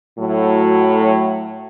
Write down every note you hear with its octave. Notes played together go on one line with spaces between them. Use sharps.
A2 F#3